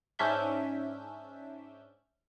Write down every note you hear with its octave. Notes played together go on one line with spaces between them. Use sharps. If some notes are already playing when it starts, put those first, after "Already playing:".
G#2 C#4 D4 E5 G6